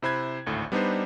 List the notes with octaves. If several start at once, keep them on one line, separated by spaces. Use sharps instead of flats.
C3 E4 C5 B5 F#6 G#6
G#1 D2 A2
G3 B3 D4 D#4 B4 C5